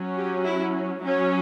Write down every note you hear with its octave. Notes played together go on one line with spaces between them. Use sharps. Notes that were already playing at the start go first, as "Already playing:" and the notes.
Already playing: F#3 C#4
G4
E4
F#3 C#4 E4